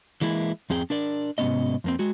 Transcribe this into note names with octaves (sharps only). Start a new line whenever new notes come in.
E3 G#3 A#3 E4
F2 C4 G#4 G5
D4 A#4 D5
G#2 C3 F#3 B3 C#4 D#5
F2 A#3 C4
G#3 F#4